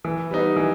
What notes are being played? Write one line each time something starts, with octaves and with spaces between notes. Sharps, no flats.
E3
G3 B3 D#4
E3